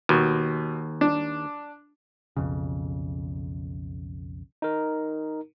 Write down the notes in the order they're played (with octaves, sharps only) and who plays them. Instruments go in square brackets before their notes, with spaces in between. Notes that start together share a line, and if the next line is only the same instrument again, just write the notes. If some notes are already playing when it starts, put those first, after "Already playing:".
[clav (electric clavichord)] D#2 [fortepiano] B2
[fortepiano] D4
[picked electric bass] B1 F2 C#3
[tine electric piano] D#4 A#4